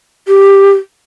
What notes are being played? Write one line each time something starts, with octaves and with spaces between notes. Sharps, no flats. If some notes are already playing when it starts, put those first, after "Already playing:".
G4